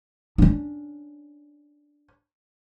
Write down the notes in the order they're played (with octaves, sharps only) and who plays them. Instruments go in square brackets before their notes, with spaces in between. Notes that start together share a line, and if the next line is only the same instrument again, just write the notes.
[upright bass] C#4 D4